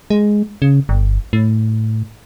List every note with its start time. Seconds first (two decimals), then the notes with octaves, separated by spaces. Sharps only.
0.10 G#3
0.62 C#3
0.89 G1
1.33 A2